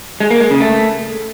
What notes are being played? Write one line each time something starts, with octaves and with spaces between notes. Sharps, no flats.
G#3
A#3
G#3
C#3
A3